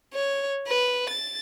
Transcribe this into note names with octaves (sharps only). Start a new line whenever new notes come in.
C#5
B4
A6